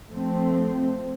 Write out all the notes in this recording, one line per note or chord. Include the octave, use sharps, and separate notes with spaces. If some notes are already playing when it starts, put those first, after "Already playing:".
F3 A3 C4